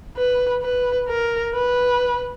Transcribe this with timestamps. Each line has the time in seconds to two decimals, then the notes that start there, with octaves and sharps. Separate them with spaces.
0.17 B4
0.63 B4
1.09 A#4
1.55 B4